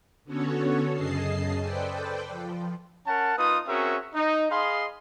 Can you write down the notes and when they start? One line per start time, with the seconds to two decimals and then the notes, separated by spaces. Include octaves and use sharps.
0.24 D3 B3 C#4 F#4 A4 C#5
0.93 F#2 C#3 G#4 D#5 A5 C7
1.61 A4 B4 C5 D5 G5
2.29 F3
3.07 C#4 A#4 F#5 A5
3.37 A#3 D#4 F4 B4 D#6
3.68 C4 C#4 F#4 G#4 A#4 E5
4.15 D#4
4.51 G#4 D#5 F5 B5 C6